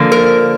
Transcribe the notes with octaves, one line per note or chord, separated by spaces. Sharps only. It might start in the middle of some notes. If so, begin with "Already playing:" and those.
Already playing: D3 F3 A#3
A#4